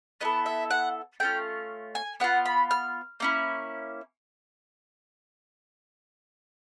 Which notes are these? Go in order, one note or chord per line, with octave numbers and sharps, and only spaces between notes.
B3 E4 A4 D#5
E5
F#5
A3 C#4 F4 G5
G#5
B3 D4 F4 F#5
B5
F6
A#3 C#4 E4